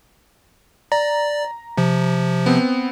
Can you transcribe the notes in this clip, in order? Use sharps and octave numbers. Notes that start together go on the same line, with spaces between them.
D5 A#5
C3 F3
B3 C4